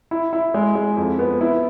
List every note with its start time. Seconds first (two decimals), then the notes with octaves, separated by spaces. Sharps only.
0.11 E4
0.33 E4
0.54 G#3
0.75 G#3
0.97 F2
1.19 B3
1.41 E4